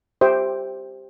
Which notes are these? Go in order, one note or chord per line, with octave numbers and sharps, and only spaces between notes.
G4 C5 E5 G5